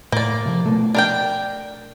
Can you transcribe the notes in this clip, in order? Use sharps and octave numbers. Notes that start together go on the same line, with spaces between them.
A2 A#3 D5
C3 F3
B2 A3
D4 A#4 G5